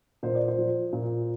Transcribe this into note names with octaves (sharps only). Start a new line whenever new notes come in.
A#2 C5
D5
C5
F3
A#2